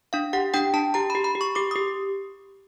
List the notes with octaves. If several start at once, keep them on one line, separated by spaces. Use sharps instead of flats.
D4 F5
G4 F#5
D4 G5
D4 A5
G4 A#5
B5
G4
B5
G4
C#6
G4 D6
G4 D#6